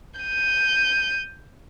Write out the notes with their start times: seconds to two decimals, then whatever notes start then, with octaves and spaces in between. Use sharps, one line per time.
0.20 G6 D#7